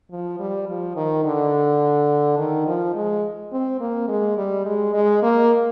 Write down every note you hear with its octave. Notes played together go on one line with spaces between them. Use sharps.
F3
G3
F3
D#3
D3
D#3
F3
G#3
C4
A#3
G#3
G3
G#3
G#3
A#3